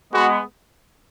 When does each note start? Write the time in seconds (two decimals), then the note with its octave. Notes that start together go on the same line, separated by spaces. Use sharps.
0.13 G#3 B3 F#4